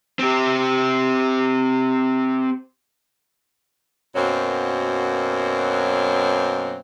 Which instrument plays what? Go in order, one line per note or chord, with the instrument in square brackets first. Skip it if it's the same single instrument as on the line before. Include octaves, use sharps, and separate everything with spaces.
[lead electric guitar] C4 G4
[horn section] F#2 B2 F#3 A#3 C4